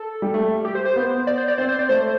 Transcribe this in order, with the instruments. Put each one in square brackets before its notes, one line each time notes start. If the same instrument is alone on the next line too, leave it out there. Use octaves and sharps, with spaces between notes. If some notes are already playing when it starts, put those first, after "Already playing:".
Already playing: [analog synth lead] A4
[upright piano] G3
A3
[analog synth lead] G4
C5
C5
[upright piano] B3
[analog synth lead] D5
C5
D5
[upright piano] C4 [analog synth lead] C5
[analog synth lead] C5
D5
[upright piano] A3 [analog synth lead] C5